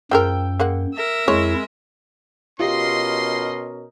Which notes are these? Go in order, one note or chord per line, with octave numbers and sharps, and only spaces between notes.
F#2 F3 G#3 A#4 G5 E6
G#3 A#3 F#5
A#4 E5
F2 G#3 E4 C#5
B2 C#4 F4 G4 A#4 D#5 C6 C7